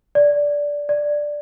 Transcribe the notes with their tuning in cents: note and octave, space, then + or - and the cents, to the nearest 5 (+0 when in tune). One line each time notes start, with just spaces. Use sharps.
D5 -10
D5 +5